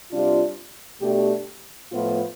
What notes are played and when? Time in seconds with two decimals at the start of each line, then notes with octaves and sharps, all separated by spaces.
0.10 C3 G3 D4 F4
1.01 B2 A3 D4 G4
1.91 A2 F3 B3 F4